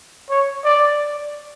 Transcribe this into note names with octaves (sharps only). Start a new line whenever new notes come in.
C#5
D5